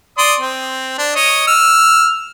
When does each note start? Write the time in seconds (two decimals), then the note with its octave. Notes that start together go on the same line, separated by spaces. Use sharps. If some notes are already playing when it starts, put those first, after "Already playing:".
0.18 D5 C6 D#6
0.40 C4
0.98 D4
1.15 C#5 D#5
1.48 E6 F6